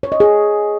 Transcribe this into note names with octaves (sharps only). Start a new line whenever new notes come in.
C#5
D#5
G#4